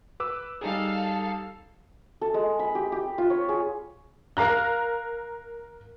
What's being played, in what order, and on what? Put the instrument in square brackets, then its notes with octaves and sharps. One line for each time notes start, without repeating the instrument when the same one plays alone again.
[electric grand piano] B4 D6 E6
[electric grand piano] G3 D#4 G#4 [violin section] A4 F5
[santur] A4
G#3
B5
G4
G4
F4
C#5
G#4
[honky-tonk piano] A#4 F5 A#5 F#6